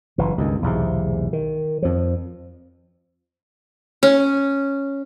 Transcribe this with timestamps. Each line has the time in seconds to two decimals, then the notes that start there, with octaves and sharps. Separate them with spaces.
0.18 F#1 E3
0.38 C#2 G2 D#3
0.62 B1 E2 G#2 C3
1.33 D#3
1.82 F2 F3
4.03 C#4